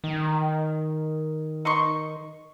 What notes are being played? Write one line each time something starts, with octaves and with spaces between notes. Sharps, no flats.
D#3
D#4 C6 C#6